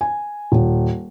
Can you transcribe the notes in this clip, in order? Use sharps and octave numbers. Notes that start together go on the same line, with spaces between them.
G#5
D#1